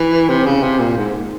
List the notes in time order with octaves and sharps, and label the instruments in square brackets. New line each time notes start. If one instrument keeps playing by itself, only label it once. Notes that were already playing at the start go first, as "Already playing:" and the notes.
Already playing: [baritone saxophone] E3
C3
C#3
C3
A#2
G#2